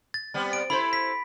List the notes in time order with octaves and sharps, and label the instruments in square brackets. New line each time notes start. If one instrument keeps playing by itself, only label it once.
[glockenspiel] A6
[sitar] G3 B3 C4
[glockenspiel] D7
[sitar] E4 A4 C5 [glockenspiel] B5
[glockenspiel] B6